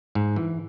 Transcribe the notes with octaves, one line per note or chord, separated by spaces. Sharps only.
G#2
E3